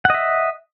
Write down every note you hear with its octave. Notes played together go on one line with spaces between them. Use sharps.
D#5 E5 F#5